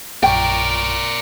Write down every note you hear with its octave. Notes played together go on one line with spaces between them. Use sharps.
A#1 F#2 A#4 D5 G5 C#6